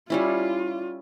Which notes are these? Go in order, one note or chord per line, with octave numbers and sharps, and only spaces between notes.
G3 C#4 E4 F4